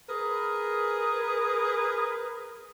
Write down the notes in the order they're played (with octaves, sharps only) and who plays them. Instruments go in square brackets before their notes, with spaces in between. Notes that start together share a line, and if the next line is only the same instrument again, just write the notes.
[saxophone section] G#4 A#4 B4